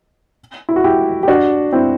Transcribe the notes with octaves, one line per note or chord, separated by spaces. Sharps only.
E4
F#4
E4 G4
G4
D4 F#4
C4 E4